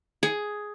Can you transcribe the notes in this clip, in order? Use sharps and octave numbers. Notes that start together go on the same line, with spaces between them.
G#4